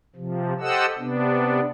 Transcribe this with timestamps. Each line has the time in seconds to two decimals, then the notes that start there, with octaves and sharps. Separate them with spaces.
0.16 C3 F3
0.60 G4 A4 C5 D#5 F#5 E6
0.98 C3 B3 D4